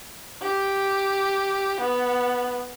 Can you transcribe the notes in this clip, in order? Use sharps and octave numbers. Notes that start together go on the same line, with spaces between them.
G4
B3